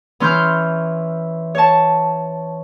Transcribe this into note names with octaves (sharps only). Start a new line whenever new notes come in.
E3 C#4 C6 F6 G6
C#5 A5